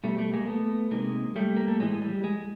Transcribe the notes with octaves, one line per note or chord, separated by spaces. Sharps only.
B2 G3 A3
G3 A3
G#3 A#3
A3 B3
C3 D#3 G#3 A#3
G3 A3
A#3
A3
A2 E3 G#3
G3
G#3